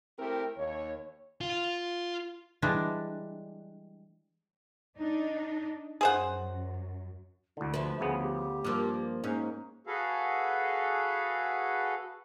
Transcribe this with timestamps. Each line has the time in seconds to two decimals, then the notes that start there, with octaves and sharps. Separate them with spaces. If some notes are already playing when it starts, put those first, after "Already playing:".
0.19 A3 C4 E4 G4 A#4
0.57 D#2 C#5
1.41 F4
2.62 E3 G3 G#3 D4
4.97 D4 D#4
6.01 F#2 G#4 C5 F#5
7.57 D2 D3 E4
7.74 F3 B4 E5
8.00 D2 C#3 B3 G#4
8.21 G4
8.64 G2 F3 A#3
9.24 G#2 A#3 C#4
9.87 F#4 G#4 A4 B4 F5